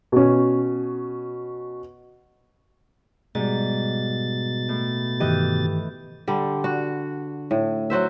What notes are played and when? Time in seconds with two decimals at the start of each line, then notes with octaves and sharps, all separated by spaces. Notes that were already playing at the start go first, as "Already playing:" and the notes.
0.12 B2 C#4
3.35 G#2 B2 G3 A6
4.69 A2
5.20 G2 D#3 E3 G4 D#5 G6
6.28 D3 G3
6.64 F#4
7.51 A2
7.90 F#3 F#4 C5 E5